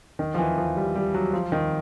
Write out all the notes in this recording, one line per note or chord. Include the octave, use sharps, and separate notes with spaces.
D#3
F3
E3
F3
G3
G3
F#3
F3
D#3